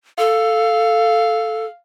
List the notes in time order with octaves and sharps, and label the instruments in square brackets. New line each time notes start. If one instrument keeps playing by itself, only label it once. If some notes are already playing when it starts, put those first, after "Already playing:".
[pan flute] A4 [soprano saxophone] F5